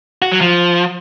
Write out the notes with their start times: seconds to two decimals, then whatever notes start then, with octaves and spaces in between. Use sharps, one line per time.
0.22 F#4
0.32 F#3
0.41 F3